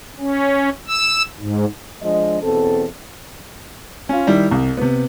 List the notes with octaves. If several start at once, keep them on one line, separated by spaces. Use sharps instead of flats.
C#4
E6
G#2
F3 G#3 D4 D#5
E2 B2 C4 A4
C#4 F4
D#3 G3 E4
C2
C3 B3